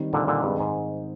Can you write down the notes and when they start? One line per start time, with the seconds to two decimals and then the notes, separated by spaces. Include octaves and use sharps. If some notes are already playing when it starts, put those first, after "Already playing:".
Already playing: D#3 G3 C4 D#4
0.13 A#2 D3
0.27 A#2 D3
0.43 G2 D#3 G#3 C4 D#4
0.60 G#2